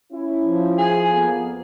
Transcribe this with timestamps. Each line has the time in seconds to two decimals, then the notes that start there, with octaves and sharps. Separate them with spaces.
0.12 C#4 E4
0.44 F3
0.78 G#4
1.09 F2 A#3 B3